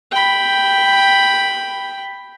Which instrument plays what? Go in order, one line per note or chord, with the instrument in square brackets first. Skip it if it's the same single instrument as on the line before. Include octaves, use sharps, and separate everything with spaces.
[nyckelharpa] G5 B5